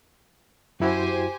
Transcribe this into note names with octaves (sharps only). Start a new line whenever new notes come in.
F#2 E4 F#4 G4 C5 G#5